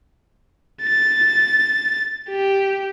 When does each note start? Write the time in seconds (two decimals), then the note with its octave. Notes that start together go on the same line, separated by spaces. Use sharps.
0.83 A6
2.30 G4